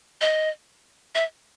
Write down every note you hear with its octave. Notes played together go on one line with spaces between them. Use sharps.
D#5
E5